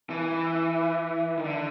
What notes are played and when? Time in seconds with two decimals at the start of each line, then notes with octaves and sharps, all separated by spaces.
0.10 E3
1.37 D#3
1.44 D3